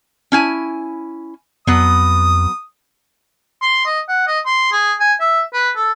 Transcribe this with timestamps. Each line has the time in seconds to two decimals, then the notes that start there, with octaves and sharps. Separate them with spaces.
0.32 C#4 E4 G#5
1.67 F2 F#3 B3 D#6
3.62 C6
3.86 D#5
4.08 F#5
4.27 D#5
4.46 C6
4.72 G#4
5.00 G#5
5.20 E5
5.53 B4
5.76 A4